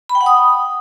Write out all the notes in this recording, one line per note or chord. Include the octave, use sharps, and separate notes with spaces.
B5
G5
F#5
D#6